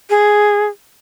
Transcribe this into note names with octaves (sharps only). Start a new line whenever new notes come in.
G#4